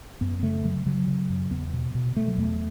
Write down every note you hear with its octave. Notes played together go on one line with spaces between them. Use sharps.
F#2 B3
C#3 A3
C#3 F#3
C#3 F#3
C#3
F#2
E2 B3
B2
B2
B2 A3
F#3
E2 A3